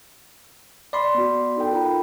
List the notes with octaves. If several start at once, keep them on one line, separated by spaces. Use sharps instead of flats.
D5 B5 C6
B3 F#4
D#4 A4 G5
F4 A#4 B5